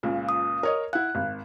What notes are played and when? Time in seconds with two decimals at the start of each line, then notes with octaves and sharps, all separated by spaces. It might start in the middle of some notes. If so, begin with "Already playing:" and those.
0.03 C#2 A#2 C#3
0.29 D#6
0.63 A#4 C#5 D#5
0.93 E4 F#5 F#6
1.15 G#1